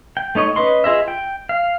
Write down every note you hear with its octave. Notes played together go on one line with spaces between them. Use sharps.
G5
A3 D#4 C#5 D#5
C#4 B4 D#5 C6
F4 G#4 D#5 E5
G5
F5